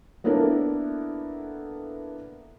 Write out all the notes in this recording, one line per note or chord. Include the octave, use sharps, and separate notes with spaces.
A#3 B3 D4 E4 A4 A#4